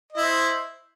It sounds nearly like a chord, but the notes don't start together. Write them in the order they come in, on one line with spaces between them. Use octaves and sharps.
D#5 E4 C5